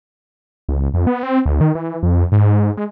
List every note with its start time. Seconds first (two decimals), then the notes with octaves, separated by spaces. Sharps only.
0.69 C#2
0.94 F2
1.07 B3
1.23 C4
1.46 D2
1.61 D#3
1.75 E3
2.03 F2
2.32 G#2
2.77 G#3